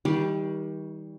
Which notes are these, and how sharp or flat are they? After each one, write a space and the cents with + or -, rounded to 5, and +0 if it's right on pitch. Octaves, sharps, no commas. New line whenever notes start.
D#3 +35 G3 +0